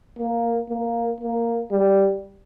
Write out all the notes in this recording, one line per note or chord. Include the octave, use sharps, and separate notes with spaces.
A#3
A#3
A#3
G3